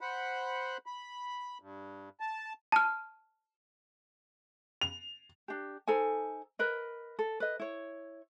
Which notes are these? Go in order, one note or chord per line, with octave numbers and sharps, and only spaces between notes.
C5 F#5 B5
B5
G2
A5
A5 F6
F7
D4 G4
D#4 A4 C5 G#5
A#4 B4 D#5
A4
B4 D#5
E4 C#5